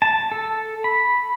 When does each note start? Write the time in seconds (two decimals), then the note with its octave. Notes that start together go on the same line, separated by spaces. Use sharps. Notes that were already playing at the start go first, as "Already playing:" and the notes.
0.02 A5
0.32 A4
0.84 B5